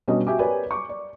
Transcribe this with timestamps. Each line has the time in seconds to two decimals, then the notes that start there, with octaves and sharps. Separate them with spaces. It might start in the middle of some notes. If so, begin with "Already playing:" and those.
0.08 B2 G3 C#4 D4 F#4 D#5
0.27 F#4 G4 E5 G#5 D6
0.39 G4 A#4 B4 C#5 D5 G#5
0.71 C#6 D6
0.89 D5